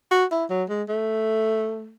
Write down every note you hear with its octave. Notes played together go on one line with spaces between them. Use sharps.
F#4
E4
F#3
G#3
A3